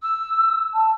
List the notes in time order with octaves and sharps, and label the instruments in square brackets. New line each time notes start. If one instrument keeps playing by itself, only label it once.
[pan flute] E6
[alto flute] A5